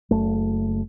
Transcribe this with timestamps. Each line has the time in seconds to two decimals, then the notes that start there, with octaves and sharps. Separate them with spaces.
0.11 F#1 A3